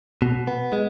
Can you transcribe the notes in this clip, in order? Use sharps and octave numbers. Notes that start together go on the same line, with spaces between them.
B2
B3
G#3